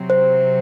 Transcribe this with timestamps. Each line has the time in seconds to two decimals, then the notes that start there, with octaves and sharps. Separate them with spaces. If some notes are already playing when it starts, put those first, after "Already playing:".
Already playing: C3 F#3 C4
0.10 C5